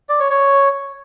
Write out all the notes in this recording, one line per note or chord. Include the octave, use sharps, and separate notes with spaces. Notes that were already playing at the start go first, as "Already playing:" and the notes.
D5
C#5
C#5